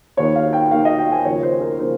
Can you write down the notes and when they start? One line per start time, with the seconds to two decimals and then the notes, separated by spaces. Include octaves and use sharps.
0.17 D#2 D#3 A#3 C#5
0.36 F5
0.53 G5
0.71 D#2 D#3 A#3 F5
0.85 D#5
0.98 G5
1.12 G#5
1.25 D#2 C#3 F3 A#3 C#5
1.43 C5
1.61 A#4
1.79 C#3 F3 A#3 C5